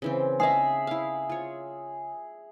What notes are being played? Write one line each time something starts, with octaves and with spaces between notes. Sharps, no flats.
C#3 E3 C4
G#4 E5 F5 A5 A#5
E4 F5
F4 C#5